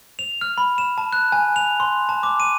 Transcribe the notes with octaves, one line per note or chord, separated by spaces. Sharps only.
F7
F6
B5
E7
A5
F#6
G#5
F7
C6
A5
D6
D#7